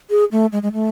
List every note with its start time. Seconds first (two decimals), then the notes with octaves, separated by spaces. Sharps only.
0.10 G#4
0.32 A3
0.52 G#3
0.63 G#3
0.73 A3